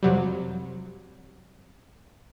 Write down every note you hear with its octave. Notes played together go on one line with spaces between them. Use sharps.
F2 C3 F#3 G3